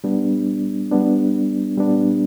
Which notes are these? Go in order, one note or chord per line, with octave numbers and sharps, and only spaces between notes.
G3 B3 D4
G3 B3 D4
G3 B3 D4